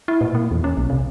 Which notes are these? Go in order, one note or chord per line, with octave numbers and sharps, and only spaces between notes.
E4
A#2
A#3
E2
C#4
B1
C3